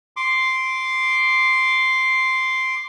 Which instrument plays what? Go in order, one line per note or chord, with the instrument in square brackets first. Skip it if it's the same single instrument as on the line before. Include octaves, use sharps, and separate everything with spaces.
[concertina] C6 D6